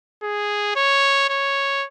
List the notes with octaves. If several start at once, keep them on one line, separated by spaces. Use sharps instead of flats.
G#4
C#5
C#5